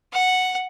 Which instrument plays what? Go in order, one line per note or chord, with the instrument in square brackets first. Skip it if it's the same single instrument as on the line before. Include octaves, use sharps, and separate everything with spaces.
[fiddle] F#5